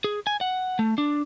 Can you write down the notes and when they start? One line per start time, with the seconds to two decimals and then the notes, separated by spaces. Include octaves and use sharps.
0.04 G#4
0.27 G#5
0.41 F#5
0.79 A3
0.98 D4